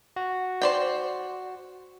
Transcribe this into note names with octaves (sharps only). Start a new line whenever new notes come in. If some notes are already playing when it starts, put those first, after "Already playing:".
F#4
C5 D5 G5